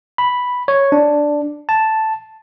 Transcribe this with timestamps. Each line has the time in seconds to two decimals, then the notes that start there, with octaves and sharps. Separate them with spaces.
0.18 B5
0.68 C#5
0.92 D4
1.69 A5